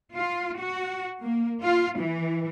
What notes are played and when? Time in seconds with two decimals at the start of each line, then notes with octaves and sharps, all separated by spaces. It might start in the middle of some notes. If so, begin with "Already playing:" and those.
0.15 F4
0.60 F#4
1.22 A#3
1.62 F4
2.00 E3